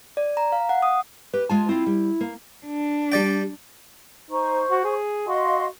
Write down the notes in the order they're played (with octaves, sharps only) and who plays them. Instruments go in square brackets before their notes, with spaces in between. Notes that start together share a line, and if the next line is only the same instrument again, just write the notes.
[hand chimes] D5
A#5
F5
F#5
D#6
[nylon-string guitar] G4 [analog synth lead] B4
[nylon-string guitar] G#3 F4 G#5 [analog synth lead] A5
[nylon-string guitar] C4 F4 [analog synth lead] E4
[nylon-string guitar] G3
A#3
[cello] D4
[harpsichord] G3 D5 G5
[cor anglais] D#4 [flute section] C5 C#6
[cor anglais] F#4
G#4
[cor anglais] F#4 [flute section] D#5 F5 C6